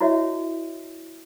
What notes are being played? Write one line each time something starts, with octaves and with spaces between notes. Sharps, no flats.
E4 F#4 C#5 D#5 E5